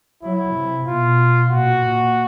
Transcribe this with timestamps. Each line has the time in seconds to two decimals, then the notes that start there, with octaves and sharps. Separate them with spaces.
0.23 F#3 E4
0.55 C3
0.87 B2 F4
1.51 A#2 F#4
1.83 A#2